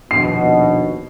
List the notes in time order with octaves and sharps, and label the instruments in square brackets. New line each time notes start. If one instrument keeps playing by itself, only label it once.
[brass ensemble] A#1 D#2 B2 [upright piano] C7